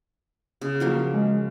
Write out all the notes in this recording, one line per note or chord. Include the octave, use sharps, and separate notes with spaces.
C#3
F3 F#3 A#3
G#3